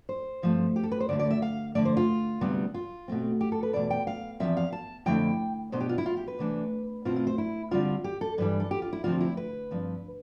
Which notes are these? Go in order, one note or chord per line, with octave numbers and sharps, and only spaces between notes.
C5
G2 F3 A3 C4
G4
A4
B4
C5
D2 D3 A3 D5
D5
E5
F5
F2 D3 A3 D5
C5
F4
D2 C3 G3 B3 D4
F4
B2 A3 C4
G4
A4
B4
E2 B2 A3 D5
G5
F5
E2 C3 F3 C4 E5
F5
A5
F2 D3 A3 E4 G5
B2 B3 D4 C5
G4
F4
E4
F4
G4
B4
C3 E3 A3 D4
B2 A3 C4 E4 F4
F4
C5
E4
D3 G3 C4 F4
G4
A4
G2 E3 G3 B4
A4
G4
F4
E4
D2 C3 F3 C4 F4
E4
B4
G2 F3 C4